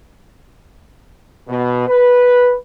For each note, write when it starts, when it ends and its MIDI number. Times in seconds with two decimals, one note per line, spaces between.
1.48 1.87 47
1.88 2.54 71